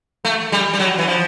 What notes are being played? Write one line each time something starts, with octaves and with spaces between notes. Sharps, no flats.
A3
G3
G3
F#3
E3
F3